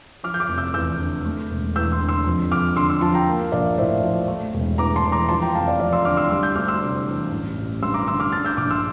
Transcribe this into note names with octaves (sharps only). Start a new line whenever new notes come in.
F3 D6 F6
G6
D6 F6
F1
E6 G6
E2 E6 G6
D3
A3
E1
E2 E6 G6
C6 E6
D3
C6 E6
F2
F2 D6 F6
D3 C6 E6
C6 E6
F3 A5 C6
G5 A#5
A#3
A#1 D5 F5
A2 C5 E5
F3
A3
E1
E2 A#5 D6
A5 C6
E3
A#5 D6
F3 A5 C6
G5 A#5
F1 F5 A5
D5 F5
F2 D5 F5
C6 E6
D3 D6 F6
C6 E6
G3 C6 E6
E6 G6
D2 D6 F6
C6 E6
C3
E3
A1
A1
G2 C6 E6
A#5 D6
D3 C6 E6
D6 F6
D4 F6 A6
E6 G6
A#1 D6 F6
C6 E6